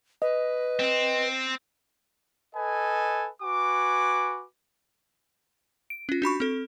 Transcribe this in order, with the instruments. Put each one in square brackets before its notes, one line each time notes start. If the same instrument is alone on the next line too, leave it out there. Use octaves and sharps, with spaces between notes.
[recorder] B4 [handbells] D#5
[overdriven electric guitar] C4
[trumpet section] A4 B4 D#5 G#5
F#4 B4 G#5 D6
[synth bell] D7
C#4 F4
D4 F#4 B5 C#6
C4 A4